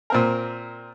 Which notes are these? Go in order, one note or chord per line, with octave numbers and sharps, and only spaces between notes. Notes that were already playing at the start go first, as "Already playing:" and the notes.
A#2 C4 A#4